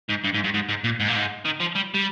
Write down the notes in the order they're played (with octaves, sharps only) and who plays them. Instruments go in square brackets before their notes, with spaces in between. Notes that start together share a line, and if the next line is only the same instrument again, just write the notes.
[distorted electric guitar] G#2
G2
G#2
G2
G#2
G#2
A#2
G#2
A#2
G#2
D#3
F3
G3
G3